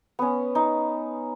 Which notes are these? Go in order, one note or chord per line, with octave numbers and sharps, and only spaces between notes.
B3 C#4
D#4